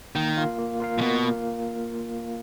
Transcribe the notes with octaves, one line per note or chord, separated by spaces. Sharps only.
D#3 A#3
F4 A#4 F5
A#3
F4 A#4 F5
A#2
B2 A#3